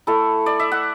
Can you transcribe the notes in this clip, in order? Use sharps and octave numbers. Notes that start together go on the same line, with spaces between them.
A3 E4 A4
D5
E5
F#5